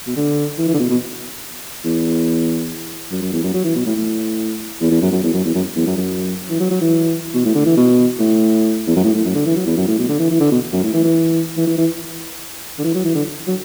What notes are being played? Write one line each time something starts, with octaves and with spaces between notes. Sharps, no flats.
B2
D3
E3
E3
D3
B2
B2
E2
F#2
F#2
E2
F#2
F#3
E3
B2
A2
A2
E2
E2
F#2
F#2
E2
F#2
E2
F#2
E2
F#2
F#2
E3
F#3
F#3
E3
B2
A2
D3
E3
B2
A2
E2
F#2
A2
A2
F#2
D3
E3
F#3
E2
F#2
A2
B2
D3
E3
E3
D3
B2
F#2
A2
E3
E3
E3
E3
E3
D3
E3
F#3
E3
D3
F#3